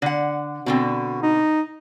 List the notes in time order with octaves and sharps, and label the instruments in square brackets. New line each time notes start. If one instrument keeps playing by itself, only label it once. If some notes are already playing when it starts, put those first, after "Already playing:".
[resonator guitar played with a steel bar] D3 F#5
[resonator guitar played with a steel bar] B2 D3 C4 [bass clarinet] F#4
[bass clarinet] D#4